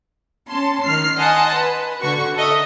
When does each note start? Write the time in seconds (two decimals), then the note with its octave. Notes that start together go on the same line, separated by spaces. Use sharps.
0.48 C#4 A5 C6
0.83 D#3 F6 C7
1.17 D#5 F#5 G#5 A5 C6
1.56 B4
2.01 D3 F#4 C#6
2.35 A4 A#4 D#5 E5